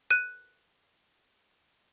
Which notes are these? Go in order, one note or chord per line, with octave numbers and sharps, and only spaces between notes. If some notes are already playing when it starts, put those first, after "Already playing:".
F#6 D#7